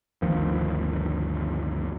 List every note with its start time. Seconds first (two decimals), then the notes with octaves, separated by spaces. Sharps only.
0.22 G1 D2 D#3 F3